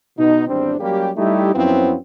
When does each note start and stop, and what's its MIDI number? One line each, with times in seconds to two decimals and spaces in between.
0.18 0.45 47
0.18 0.45 63
0.47 0.75 32
0.47 0.75 40
0.47 0.75 55
0.47 0.75 60
0.47 0.75 62
0.47 0.75 72
0.80 1.10 54
0.80 1.10 55
0.80 1.10 58
0.80 1.10 61
0.80 1.10 67
1.16 1.51 55
1.16 1.51 57
1.16 1.51 63
1.16 1.51 64
1.16 1.51 67
1.55 1.95 42
1.55 1.95 53
1.55 1.95 54
1.55 1.95 59
1.55 1.95 60
1.55 1.95 64